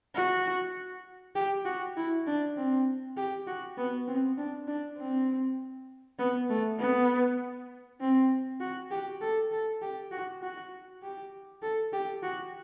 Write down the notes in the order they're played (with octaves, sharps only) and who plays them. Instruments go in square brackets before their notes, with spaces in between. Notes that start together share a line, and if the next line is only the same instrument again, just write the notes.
[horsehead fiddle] F#4
G4
F#4
E4
D4
C4
G4
F#4
B3
C4
D4
D4
C4
B3
A3
B3
C4
F#4
G4
A4
A4
G4
F#4
F#4
G4
A4
G4
F#4